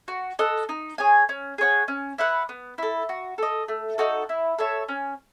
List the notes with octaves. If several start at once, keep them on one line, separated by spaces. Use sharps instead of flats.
F#4
A4 D#5 F#5
D#4
G#4 C#5 G#5
C#4
G#4 C#5 F#5
C#4
E4 B4 F#5
B3
E4 A4
F#4
A4 D#5
A3
D#4 F#4 A4
E4
A4 C#5 E5
C#4